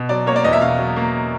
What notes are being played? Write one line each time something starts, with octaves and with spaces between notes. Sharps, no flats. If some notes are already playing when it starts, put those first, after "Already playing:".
Already playing: B2
F#3 D5
A#3 C#5
D5
E2 D#5
E5
B2 F5
F#3
A#3